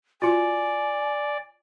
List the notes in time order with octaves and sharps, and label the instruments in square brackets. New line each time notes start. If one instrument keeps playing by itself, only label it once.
[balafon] F4 F#4 [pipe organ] D5 [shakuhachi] G#5